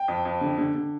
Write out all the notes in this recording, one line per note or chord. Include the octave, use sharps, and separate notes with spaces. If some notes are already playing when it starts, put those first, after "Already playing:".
Already playing: G5
F2
F2
D3
D3
D3